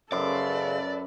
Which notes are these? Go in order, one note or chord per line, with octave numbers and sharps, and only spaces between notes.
F#2 C#3 A4 B4 D5 C6